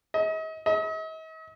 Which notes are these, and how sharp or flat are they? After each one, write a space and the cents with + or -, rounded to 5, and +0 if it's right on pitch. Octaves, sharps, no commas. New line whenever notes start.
D#5 +40
D#5 +45